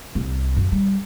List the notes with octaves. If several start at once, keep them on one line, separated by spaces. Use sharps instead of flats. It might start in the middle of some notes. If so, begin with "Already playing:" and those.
C2
F#2
G3